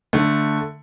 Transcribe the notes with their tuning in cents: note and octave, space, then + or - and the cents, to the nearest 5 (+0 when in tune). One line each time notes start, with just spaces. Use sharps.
D3 +0 A3 +0